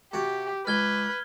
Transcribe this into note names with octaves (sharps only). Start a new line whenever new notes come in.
C3 F#4 G4
C#2 B4 F6 G#6 G7